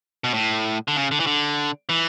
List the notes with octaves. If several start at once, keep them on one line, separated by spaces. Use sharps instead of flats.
B2
A2
D3
C#3
D3
E3
D3
E3